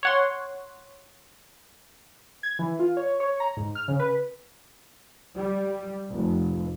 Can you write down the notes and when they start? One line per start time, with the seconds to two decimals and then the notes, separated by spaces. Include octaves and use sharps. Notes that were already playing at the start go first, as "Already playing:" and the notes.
0.03 C#5 F#5 C6
2.43 G#6
2.59 E3
2.79 F4
2.97 C#5
3.20 C#5
3.40 A#5
3.57 G#2
3.75 F6
3.88 C#3
4.00 B4
5.37 G3
6.11 F1